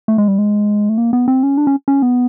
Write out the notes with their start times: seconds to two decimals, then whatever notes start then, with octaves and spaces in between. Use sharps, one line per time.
0.08 A3
0.18 G#3
0.28 G3
0.38 G#3
0.89 A3
0.98 A#3
1.13 B3
1.28 C4
1.43 C#4
1.58 D4
1.67 C#4
1.88 C#4
2.02 B3